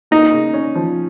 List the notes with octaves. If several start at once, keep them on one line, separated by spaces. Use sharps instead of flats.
A#3 D#4
C#3
C#4
F3